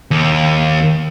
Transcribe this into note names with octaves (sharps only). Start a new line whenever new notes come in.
D#2